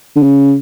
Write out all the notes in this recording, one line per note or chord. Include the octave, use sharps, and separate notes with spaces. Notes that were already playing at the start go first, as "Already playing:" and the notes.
D3
C#3